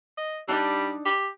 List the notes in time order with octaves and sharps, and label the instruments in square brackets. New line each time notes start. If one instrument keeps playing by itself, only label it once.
[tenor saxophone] D#5
[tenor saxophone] G3 [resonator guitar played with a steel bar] D4 D#4 D5
[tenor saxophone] G4